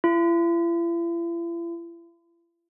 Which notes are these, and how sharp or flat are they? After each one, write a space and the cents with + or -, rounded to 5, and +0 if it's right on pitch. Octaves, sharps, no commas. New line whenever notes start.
E4 +45